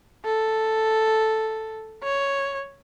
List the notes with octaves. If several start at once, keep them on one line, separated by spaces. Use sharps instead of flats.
A4
C#5